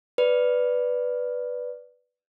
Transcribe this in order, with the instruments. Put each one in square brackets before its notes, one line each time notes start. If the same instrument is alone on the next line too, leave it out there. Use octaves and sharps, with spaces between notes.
[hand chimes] B4 D5